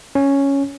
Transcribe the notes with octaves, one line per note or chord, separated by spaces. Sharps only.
C#4